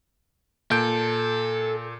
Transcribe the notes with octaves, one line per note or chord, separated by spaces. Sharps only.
A#2 A4 G6 D7